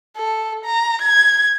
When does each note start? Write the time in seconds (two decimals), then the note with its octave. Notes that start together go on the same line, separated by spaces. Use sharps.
0.17 A4
0.65 A#5
1.02 G#6